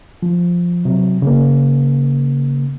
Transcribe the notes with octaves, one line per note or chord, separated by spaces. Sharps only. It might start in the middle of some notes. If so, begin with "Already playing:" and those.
F3
C3 F#3
C#3 A#3